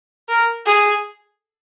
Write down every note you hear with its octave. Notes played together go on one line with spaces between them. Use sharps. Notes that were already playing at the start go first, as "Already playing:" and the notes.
A#4
G#4